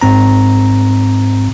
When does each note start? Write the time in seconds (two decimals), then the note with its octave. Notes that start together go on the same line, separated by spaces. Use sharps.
0.02 G#2 C4 A#5